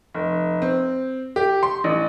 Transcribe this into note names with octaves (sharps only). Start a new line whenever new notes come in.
F1
C4
G4
C6
A1